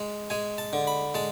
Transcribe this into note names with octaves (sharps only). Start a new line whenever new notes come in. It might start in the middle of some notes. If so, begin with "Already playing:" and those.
Already playing: G#3
G#3 G#5
A5
D3
B5
G#3 A5